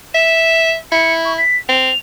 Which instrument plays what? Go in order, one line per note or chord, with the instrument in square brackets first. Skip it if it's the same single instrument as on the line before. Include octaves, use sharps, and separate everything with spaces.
[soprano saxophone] E5 [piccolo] E7
[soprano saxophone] E4 [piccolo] C#7
[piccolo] C#6
B6
[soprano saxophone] C4 [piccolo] F7